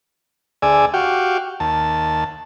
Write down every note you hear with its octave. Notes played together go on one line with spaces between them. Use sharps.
D2 G#4 D5 G#5 E6
F#4 G4 F5 G5
D#2 A5